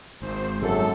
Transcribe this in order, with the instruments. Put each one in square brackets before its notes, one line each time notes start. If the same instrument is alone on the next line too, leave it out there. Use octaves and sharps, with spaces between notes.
[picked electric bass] G#1 [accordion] C5
[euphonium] F#2 [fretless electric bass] G#3 A#3 [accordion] A4